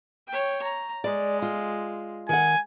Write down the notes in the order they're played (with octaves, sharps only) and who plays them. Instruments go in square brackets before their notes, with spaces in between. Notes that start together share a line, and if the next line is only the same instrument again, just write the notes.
[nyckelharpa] C#5 G5
A#5
[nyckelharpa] G#3 [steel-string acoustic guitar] D5
[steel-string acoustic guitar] F4
[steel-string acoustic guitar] D#3 F#5 [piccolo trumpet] G#5